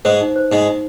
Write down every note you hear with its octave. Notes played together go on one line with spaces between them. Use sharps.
G#2 G#3 C5
D#4
C5
G#2 G#3 D#4
D#4